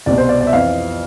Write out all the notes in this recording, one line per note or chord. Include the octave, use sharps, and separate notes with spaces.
C2 B2 D5
C5
D5
D5
E5
F2 E3 F5